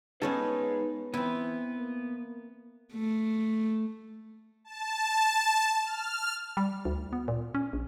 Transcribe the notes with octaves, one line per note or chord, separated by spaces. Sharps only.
G#3 B3 C#4 D#4 A4 B4
E3 B3 C4 E4
A#3
A3
A5
F6
G3
D2
B3
A#2
C#4
A#1